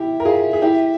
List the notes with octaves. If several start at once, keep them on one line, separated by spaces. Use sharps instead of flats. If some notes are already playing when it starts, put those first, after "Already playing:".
Already playing: E4 G4 E5
A#4
F4 G#4
G#4
E4 G4